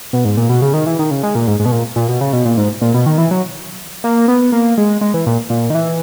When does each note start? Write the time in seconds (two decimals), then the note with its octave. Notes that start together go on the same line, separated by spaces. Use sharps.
0.13 B2
0.25 G#2
0.37 A#2
0.49 B2
0.62 C#3
0.73 D#3
0.86 E3
0.99 D#3
1.11 C#3
1.23 G#3
1.35 A#2
1.47 G#2
1.60 G#2
1.65 B2
1.72 A#2
1.96 A#2
2.09 B2
2.21 C#3
2.33 B2
2.45 A#2
2.57 G#2
2.81 A#2
2.94 B2
3.06 D#3
3.18 E3
3.31 F#3
4.04 A#3
4.28 B3
4.52 A#3
4.78 G#3
5.01 G#3
5.14 E3
5.26 A#2
5.50 A#2
5.70 D#3
5.75 E3